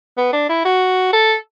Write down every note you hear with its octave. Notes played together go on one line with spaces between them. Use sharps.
B3
D4
E4
F#4
A4